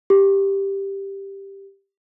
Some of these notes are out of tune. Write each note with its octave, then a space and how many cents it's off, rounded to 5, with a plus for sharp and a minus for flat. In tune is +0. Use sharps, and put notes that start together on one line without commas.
G4 +5